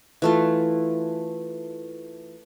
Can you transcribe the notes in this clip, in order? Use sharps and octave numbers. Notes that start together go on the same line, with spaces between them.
E3 A3 F4